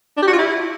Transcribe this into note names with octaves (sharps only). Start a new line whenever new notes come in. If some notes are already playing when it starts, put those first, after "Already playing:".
D4
G4
F#4
F4
E4